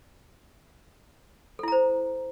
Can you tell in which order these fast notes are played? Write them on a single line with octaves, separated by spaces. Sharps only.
A4 E4 A#5 C5